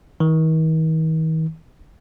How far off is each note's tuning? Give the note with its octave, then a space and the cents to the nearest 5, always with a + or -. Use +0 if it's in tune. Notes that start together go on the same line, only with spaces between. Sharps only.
D#3 +40